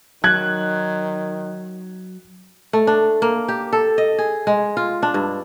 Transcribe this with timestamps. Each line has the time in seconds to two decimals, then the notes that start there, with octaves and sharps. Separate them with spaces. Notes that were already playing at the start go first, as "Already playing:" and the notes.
0.24 D#3 F#3 F#6 G#6
2.73 A3
2.87 D4
3.22 A#3
3.48 G4
3.73 A4
3.98 D#5
4.19 G#4
4.47 G#3
4.77 F4
5.03 D4
5.14 G2